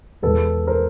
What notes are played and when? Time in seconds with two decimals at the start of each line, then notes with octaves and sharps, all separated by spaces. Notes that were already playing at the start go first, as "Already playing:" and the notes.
0.23 E2 B2 G#3 A4 B4
0.67 A#4 C5